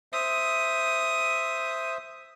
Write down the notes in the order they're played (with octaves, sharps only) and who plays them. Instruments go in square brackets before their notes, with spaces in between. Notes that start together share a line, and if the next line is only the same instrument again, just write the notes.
[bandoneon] C5 E5 [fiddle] D#6